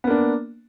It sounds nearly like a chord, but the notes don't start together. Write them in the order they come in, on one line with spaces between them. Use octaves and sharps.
B3 A#3 D4